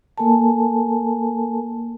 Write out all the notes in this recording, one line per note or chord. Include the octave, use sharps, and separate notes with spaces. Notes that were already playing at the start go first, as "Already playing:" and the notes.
A#3 A4 A#4 G#5 A5